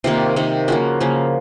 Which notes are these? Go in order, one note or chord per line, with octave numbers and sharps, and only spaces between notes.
C3 D#3 A#3 F4
C3 D#3 A#3
C#3 F3 A#3 F#4
C#3 F3 A#3